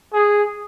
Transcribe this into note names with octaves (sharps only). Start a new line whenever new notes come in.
G#4